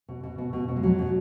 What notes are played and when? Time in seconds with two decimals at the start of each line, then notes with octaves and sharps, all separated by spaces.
0.09 B2
0.23 B2
0.38 B2
0.53 B2
0.68 B2
0.76 G#3
0.83 B2 F#3
0.98 B2